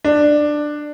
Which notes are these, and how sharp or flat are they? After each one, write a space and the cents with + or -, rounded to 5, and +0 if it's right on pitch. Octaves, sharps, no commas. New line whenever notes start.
D4 +15